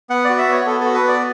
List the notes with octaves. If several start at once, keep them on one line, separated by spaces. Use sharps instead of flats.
B3 F#5
F#4 D5
E5
B3 C#5
B3 A4
A4
F#4
B4
B3 D5